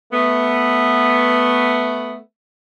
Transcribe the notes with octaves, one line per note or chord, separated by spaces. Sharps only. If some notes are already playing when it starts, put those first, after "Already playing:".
A3 B3